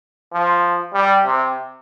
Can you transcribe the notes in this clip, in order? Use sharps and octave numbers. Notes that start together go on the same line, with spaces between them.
F3
G3
C3